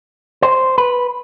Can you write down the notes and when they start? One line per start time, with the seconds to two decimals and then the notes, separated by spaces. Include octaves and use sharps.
0.42 C5
0.78 B4